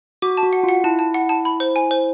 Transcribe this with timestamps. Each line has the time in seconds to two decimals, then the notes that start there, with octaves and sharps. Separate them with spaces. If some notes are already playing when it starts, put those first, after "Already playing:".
0.22 F#4 D6
0.37 A5
0.43 F#4
0.53 F#5
0.63 F4
0.69 F#5
0.84 E4 A5
0.99 A5
1.14 F#5
1.29 A5
1.45 B5
1.60 C5
1.76 G#5
1.91 C5